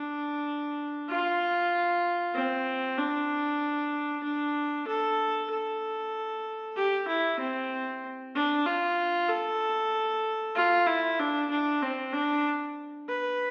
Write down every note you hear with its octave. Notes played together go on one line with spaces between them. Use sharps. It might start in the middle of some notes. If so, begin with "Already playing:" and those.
Already playing: D4
F4
C4
D4
D4
A4
A4
G4
E4
C4
D4
F4
A4
F4
E4
D4
D4
C4
D4
B4